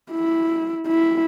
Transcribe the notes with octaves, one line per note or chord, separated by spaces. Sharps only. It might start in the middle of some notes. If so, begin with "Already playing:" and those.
E4
E4